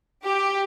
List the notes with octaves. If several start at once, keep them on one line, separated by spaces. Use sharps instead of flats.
G4